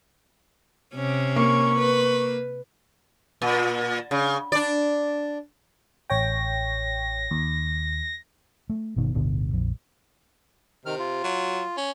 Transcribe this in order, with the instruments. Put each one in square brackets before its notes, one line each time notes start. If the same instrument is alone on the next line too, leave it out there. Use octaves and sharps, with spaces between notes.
[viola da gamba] C3 C#4
[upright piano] A#3 [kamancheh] C#6
[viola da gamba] B4
[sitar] A#2
C#3
D4 D5
[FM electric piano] A1 C#5 G5 [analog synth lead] A#6
[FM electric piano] D#2
[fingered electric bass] A3
G1 B2 D#3
D1 G1 B2 D3
A#1 F2
[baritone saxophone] C3 [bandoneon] D#3 F6
[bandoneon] F4
[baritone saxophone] F#3
C#4